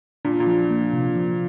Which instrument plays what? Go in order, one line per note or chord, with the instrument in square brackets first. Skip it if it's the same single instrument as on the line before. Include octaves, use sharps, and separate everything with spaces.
[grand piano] A#2 [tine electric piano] D4
[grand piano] A#2
[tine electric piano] F3
A#3
C3
F3